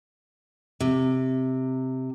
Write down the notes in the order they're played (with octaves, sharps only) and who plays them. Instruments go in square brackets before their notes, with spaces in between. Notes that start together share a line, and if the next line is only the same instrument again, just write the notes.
[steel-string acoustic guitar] C3